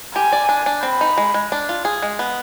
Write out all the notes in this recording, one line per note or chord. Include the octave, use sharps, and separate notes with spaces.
G4 G#5
D5
D4
D4
C4 B5
D#4
G#3
G#3
D4
F4
G#4
G#3
B3